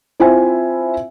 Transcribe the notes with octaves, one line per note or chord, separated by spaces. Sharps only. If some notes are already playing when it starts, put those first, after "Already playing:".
C4 E4 F4 C5 E5 G#5